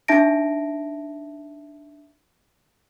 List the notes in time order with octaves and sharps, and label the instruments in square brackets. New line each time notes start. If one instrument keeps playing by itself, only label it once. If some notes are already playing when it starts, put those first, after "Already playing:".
[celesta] D4 D#4 E5 A5 A#6 D7